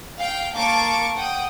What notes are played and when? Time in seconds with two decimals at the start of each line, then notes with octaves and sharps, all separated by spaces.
0.17 F5 G5
0.55 A#3 A5 C#6 D6
1.15 F#5 G5 D#6